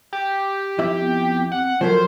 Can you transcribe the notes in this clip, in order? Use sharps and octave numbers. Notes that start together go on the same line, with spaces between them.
G4
F2 E4 E5
B3
C4 F#5
F3 F#3 A3 A#4 C5